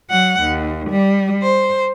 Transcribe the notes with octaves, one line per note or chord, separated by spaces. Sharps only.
F#3 F#5
D#2
G3
C5